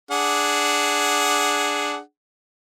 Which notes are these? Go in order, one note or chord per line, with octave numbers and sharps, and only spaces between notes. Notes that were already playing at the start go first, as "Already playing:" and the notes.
D4 G#4 F#5